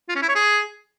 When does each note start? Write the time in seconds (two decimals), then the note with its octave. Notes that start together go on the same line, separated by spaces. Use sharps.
0.09 F4
0.15 C#4
0.22 E4
0.29 C#5
0.35 G#4